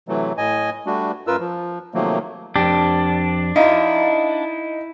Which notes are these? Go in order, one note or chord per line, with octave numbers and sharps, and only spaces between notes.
C3 E3 F#3 A3
A2 D#5 G#5
G3 A3 D4 F#4
F#2 F4 A#4 B4 E6
F3
C3 D#3 F3 F#3 A3 A#3
F2 D4 G4
D#4 E4 F5